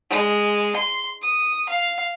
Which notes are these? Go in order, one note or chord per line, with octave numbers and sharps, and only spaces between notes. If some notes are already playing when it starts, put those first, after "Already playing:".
G#3
C6
D#6
F5